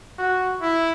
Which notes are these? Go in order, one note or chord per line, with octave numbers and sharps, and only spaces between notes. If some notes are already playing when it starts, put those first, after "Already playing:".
F#4
E4